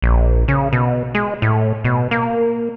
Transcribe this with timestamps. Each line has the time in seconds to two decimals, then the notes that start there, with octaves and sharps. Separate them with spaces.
0.02 A#1
0.48 C#3
0.73 B2
1.14 G#3
1.42 A2
1.84 B2
2.11 A#3